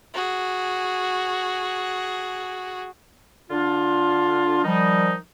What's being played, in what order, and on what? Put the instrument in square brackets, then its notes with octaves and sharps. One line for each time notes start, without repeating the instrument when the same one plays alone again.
[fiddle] F#4 G#4
[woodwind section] D3 D4 F4
D#3 F3 G3 D#4